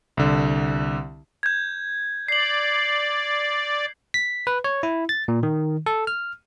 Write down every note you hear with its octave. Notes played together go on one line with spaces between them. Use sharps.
C2 D3
G6 G#6
D5 C7 F#7
B6
B4
C#5
E4
A6
A#2
D#3
A4
F6